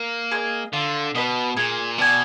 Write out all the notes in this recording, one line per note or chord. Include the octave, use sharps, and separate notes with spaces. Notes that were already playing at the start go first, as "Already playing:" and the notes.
Already playing: A#3
G#4 B4 D#5
D3 F4
B2 B4 D#5
A#2 G#4
B2 D5 G#5